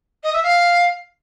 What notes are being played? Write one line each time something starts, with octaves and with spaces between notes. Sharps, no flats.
D#5
E5
F5